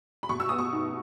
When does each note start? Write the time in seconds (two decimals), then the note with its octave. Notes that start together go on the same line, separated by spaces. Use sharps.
0.23 B5
0.29 B2 C#6
0.40 E6
0.49 B3 D#6
0.59 C#6
0.73 D#4